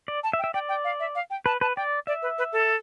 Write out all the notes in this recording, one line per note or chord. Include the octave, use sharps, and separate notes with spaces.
D5
A5
E5
G5
E5
D5 G5
G5
F5
E5
F5
G5
B4 A5
B4 A5
D5 G5
D5 E5
B4
B4
A4